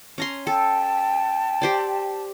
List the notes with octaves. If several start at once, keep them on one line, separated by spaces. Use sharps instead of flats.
C#4 A#5 C6
A4 G5 A5
G4 C5 D5